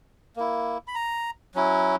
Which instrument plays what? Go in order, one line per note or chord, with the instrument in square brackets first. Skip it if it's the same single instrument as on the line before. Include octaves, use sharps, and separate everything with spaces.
[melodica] A#3 E4
B5
A#5
F#3 C#4 E4